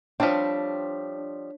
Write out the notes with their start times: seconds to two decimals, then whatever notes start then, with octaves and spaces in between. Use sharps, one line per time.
0.20 F3 G3 C4 D4 C#5 B6